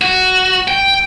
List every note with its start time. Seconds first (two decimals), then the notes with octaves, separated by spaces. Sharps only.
0.01 F#4
0.68 G5